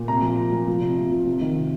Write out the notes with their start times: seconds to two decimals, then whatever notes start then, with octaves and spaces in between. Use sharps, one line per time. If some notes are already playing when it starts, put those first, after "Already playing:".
Already playing: A#2
0.08 C3 A#5
0.22 F3
0.38 C3
0.52 F3
0.68 F3
0.82 C3
0.97 C3
1.12 F3
1.26 C3
1.41 D#3
1.56 C3